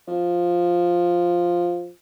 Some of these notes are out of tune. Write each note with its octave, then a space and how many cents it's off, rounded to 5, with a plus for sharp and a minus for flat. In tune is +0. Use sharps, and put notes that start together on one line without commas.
F3 +5